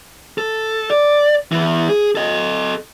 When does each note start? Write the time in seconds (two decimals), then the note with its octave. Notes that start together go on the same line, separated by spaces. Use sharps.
0.38 A4
0.90 D5
1.52 E3 B3
1.89 G#4
2.15 A4 D#5